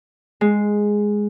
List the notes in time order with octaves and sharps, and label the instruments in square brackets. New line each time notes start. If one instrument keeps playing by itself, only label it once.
[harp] G#3